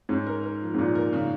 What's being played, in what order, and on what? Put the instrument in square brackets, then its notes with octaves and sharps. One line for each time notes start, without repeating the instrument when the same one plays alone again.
[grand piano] G#2 [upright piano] C#4
[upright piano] A#4
A#4
F3
[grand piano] G#2
[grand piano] A#2 [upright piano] F3
[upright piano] A#4
C#3